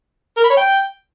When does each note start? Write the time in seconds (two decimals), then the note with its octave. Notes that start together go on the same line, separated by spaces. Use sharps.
0.37 A#4
0.44 B5
0.50 C#5
0.57 G5